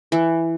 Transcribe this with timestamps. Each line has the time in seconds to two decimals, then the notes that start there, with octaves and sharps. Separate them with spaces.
0.12 E3